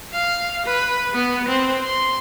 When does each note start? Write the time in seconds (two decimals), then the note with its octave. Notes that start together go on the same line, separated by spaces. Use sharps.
0.13 F5
0.66 B4
1.14 B3
1.48 C4
1.84 C6